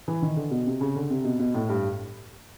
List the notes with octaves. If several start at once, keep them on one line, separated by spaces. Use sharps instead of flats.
E3
D#3
D3
B2
C3
C#3
D3
C3
B2
B2
A2
G2